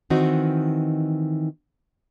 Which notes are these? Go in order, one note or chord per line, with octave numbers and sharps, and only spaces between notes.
D#3 E3 C4 D#4 F#4